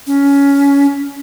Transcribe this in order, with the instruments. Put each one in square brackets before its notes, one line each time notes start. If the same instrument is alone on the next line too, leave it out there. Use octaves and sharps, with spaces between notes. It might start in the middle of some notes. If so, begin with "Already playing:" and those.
[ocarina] C#4